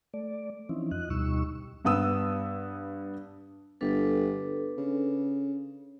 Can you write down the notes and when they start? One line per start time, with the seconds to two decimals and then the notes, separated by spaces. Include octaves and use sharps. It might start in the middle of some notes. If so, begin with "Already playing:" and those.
0.14 A3 D5
0.69 E3 F3 C4 C#4 D#4 E4
0.91 F2 F4 D#5 F#6
1.10 D2 B2 G3 D#4 C#6 E6
1.85 G2 B3 D#6 E6
3.81 G1 D4 A4 B4
4.77 C#3